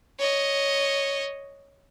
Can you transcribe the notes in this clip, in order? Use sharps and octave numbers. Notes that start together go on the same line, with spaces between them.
C#5 D#5